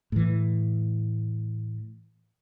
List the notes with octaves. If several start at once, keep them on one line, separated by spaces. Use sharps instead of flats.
A2 E3